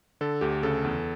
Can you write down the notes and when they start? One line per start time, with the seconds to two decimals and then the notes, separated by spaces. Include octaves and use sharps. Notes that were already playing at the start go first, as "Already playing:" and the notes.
0.21 D3 A4
0.41 D2 G4
0.63 C#3 A4
0.84 E2